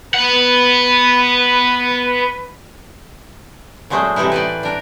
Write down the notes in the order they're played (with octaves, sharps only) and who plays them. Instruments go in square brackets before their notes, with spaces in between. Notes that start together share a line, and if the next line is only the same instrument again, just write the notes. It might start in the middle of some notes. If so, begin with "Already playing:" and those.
[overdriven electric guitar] B3 F#5 [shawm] B4
[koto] A#2 F#3 G#3 A3 C5
A2 C3 E3 D#4 E4
B4 C5 D5
D4 A#4